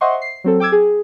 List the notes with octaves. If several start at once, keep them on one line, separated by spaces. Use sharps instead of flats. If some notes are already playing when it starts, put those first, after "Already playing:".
C5 D#5 E5 F#5 C6 C#6
C7
F#3 C4 A4
G5 D6 E6 G#6
G#4